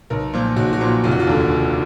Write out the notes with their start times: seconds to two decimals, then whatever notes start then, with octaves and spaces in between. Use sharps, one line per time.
0.10 B1 A#4
0.33 A#2 F3
0.56 B1 F#4
0.73 F#4
0.80 A#2 F3
1.04 F1 F4
1.11 F#4
1.20 F4
1.27 D#2 D3
1.51 F1